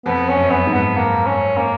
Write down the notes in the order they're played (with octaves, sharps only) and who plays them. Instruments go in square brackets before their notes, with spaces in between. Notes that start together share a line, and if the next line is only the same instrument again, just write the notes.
[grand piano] F2 [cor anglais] B3
[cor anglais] C#4
[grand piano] F#2
[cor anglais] B3
[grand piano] G#2
[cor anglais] B3
A#3
C#4
A#3